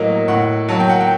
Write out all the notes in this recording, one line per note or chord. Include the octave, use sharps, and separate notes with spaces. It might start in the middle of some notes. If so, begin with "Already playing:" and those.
Already playing: A2 F#3 A#3 D#5
A2 F#5
F#3 A#3 A5
G5
F#5
G5